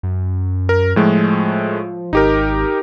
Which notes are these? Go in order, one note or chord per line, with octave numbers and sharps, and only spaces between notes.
F#2
A#4
A2 F3 G#3 A3
G#1 D#4 G4 A#4